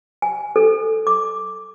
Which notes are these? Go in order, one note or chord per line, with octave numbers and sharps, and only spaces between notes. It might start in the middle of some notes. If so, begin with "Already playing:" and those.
G#5
A4
D6